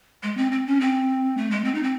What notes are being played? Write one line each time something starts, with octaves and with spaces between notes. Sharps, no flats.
G#3
C4
C4
C#4
C4
A3
G#3
C4
D#4
C4